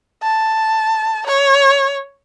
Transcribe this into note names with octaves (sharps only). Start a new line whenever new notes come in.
A5
C#5